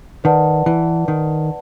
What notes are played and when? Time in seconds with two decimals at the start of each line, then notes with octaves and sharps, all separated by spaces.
0.24 D#3 B4 D5 F#5 A5
0.66 E3
1.08 D#3